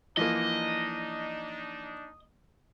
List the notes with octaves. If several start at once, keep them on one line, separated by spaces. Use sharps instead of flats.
E3 F3 A#3 D4 D#4 D#5